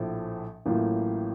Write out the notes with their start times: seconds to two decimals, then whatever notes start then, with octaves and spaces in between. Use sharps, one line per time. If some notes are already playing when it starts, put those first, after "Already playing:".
Already playing: A#1 A2 F3 A3
0.65 A1 A2 F#3 A#3 F4